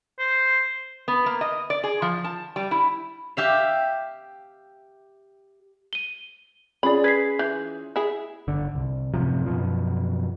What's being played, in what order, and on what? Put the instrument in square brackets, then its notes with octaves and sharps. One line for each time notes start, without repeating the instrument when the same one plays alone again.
[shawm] C5
[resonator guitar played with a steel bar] B3
A#3
D#5
D5
G#4
F3
A5
G3
E4
[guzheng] G4 E5 F5
[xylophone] D#7 G7
[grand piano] C#4 F4 G#4 [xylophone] C#5 D5 [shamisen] B5
[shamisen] B4 [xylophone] G#6 B6 C7
[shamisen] E3 [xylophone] G6
[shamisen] E4 G#4
[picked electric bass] G1 D3
C2
F#2 A2 C3 F3
F#2 B2 F3